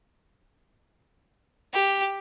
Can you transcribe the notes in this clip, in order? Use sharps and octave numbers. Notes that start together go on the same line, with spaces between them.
G4